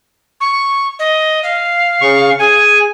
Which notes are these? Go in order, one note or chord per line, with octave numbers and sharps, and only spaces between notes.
C#6
D#5
F5
C#3 C#6
G#4 G#5